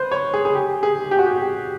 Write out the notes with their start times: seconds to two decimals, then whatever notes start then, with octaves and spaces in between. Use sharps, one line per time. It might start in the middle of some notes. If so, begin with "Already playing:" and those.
Already playing: B4 C5
0.12 C#5
0.34 G#4
0.45 G#4
0.55 G4
0.83 G#4
1.11 G4
1.19 F#4
1.26 G4